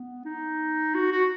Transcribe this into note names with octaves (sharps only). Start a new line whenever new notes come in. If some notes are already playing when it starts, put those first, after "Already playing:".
Already playing: B3
D#4
F#4
F#4